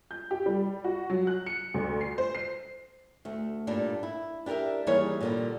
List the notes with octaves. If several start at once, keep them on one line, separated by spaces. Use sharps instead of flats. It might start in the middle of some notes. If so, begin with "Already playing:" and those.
G6
G4
G3
F#4
F#3
F#6
C#7
D2
C7
C5
C7
D2 A3
G2 A#2 G3 D4
E4
D4 G4 G#4 A#4 E5
D#2 E3 G3 G#4 A#4 C#5
A#2 D3 G3